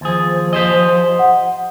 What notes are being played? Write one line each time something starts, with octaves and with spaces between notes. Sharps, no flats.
D#2 F3 G#4
G4 C5 D#5
F#5